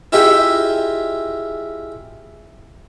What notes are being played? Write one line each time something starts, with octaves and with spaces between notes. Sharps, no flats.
E4 F4 G4 G#4 D#5 E5